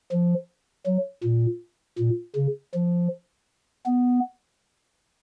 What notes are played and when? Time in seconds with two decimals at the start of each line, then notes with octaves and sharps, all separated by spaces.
0.11 F3
0.86 F#3
1.24 A#2
1.98 A#2
2.36 C#3
2.74 F3
3.86 B3